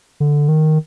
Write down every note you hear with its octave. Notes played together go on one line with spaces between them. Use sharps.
D3
D#3